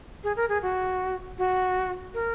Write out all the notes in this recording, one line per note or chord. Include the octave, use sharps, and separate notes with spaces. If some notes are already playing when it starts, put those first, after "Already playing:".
G#4
A#4
G#4
F#4
F#4
A#4